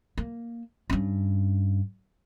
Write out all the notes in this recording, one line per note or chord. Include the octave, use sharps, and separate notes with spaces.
A#3
G2 C#4